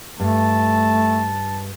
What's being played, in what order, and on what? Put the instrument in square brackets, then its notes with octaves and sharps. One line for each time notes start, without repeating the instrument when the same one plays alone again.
[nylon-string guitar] G2 [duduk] A3 [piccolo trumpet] A5